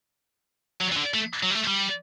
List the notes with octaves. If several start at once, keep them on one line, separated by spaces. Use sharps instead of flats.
F#3
E3
D3
A3
F#3
G3
A3
G3